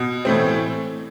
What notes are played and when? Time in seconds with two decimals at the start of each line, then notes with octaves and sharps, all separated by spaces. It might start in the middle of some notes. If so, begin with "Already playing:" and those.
Already playing: B2
0.25 A2 E3 A3 C4